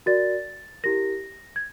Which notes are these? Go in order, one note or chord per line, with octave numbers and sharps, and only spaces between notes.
F#4 A#4 D5 A6
E4 G4 A#4 A#6
G#6